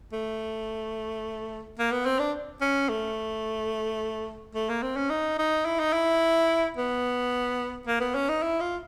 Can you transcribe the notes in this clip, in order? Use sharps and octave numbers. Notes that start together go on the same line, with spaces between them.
A3
A#3
B3
C4
D4
C#4
A3
A3
A#3
C4
C#4
D#4
D#4
E4
D#4
E4
B3
A#3
B3
C#4
D#4
E4
F4